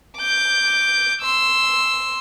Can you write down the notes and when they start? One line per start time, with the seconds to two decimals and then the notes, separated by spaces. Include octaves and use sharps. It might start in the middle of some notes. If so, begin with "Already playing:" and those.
0.18 D6 G6
1.22 C6 E6